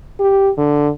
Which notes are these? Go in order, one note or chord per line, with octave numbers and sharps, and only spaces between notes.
G4
D3